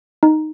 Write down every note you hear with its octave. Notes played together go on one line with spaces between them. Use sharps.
D#4